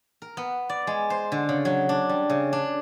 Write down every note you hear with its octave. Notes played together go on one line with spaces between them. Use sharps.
A#4
B3
D5
G#3
C5
D3
C#3
F#3
D4
G3
C#3
D4